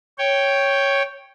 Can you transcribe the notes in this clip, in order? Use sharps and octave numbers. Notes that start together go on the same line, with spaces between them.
C#5 G5